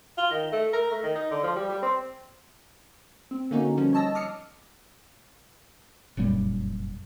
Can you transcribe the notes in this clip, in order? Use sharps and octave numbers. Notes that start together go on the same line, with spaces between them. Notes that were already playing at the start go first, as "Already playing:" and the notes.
F4
D#3
A3
A#4
A3
D#3
D#4
D3
F3
G3
G3
C4
C4
D3 A#3 C#4 D#4 F#4
F3 G3 C#4
C#5 D#5 A5 E6 A#6
D6 D#6 F6 C7 C#7
F1 F#2 A#2 G3